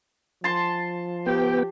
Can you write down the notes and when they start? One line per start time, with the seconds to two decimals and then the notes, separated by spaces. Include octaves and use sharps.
0.44 F3 A5 C6
1.26 B3 G4 G5